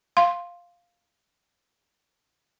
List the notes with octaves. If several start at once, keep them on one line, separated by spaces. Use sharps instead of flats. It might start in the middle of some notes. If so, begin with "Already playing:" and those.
F5 C6